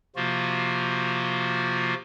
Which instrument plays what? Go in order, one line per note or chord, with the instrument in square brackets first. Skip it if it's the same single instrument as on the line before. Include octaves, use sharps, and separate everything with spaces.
[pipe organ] C3 F3 A#3 F4 F#4